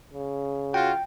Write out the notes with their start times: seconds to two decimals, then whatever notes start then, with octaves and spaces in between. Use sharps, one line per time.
0.14 C#3
0.74 F4 F#4 G5